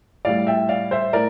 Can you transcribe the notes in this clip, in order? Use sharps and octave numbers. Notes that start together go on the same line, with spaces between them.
A2 G3 D5 F5
E5 G5
D5 F5
C5 E5
A2 A#4 D5